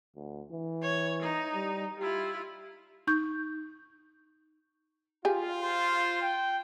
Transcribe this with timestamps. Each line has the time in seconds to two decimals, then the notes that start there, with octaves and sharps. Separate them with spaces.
0.16 D2
0.52 E3
0.82 C#5
1.23 D#4
1.54 G3
1.99 E4 F4 G4
3.07 D#4 C#6 G6
5.25 F4 G4 G#4
5.61 C5
6.21 G5